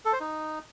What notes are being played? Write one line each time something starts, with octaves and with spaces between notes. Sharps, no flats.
A4
C5
D#4